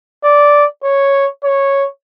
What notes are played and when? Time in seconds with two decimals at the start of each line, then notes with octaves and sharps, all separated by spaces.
0.23 D5
0.84 C#5
1.44 C#5